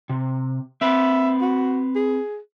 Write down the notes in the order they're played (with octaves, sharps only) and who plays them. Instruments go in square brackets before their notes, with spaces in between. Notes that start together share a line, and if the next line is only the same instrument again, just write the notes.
[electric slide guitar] C3
[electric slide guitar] C4 B4 [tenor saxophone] E5
[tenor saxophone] F#4
G#4